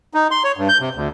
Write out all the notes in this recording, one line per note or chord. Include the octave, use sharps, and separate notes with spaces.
D#4
C6
C#5
G2
G6
C3
D2